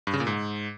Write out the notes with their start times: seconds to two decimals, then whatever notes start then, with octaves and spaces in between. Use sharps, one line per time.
0.07 G2
0.13 C#3
0.20 A#2
0.27 G#2